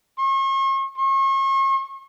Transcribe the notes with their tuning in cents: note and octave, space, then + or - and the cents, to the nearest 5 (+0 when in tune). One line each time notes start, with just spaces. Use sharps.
C#6 -45
C#6 -40